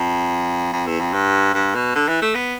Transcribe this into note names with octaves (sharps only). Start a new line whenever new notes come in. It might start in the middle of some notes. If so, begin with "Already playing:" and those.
Already playing: F2
F2
E2
F2
G2
G2
B2
D3
E3
A3
B3